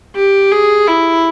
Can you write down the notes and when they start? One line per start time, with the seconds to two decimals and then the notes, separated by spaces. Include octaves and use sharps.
0.16 G4
0.52 G#4
0.88 E4